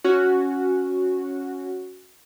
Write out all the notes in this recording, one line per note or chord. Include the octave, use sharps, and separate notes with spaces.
C#4 F#4